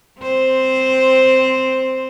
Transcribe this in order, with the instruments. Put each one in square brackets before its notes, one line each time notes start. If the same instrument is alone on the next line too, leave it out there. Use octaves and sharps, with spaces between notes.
[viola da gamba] C4 C5